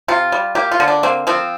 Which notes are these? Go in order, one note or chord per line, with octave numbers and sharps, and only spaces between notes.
C3 F4
G3
A#3 G4
F4
D3
D4
A#3 C4
F3 C4